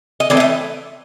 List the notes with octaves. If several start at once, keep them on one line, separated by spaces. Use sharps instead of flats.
D#5
E3 A3 C4 D5
E5
D#5